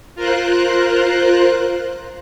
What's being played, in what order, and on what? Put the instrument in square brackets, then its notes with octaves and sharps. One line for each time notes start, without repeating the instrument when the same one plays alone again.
[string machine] F4 A#4 C5 F#6